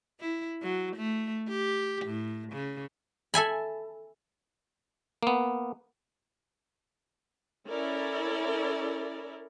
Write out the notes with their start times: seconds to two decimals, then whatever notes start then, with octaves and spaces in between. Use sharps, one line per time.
0.20 E4
0.62 F#3
0.96 A3
1.48 G4
2.06 A2
2.53 C#3
3.34 A4 E5 G#5 B5
5.23 A#3 B3
7.69 C#4 E4 A4 A#4 D5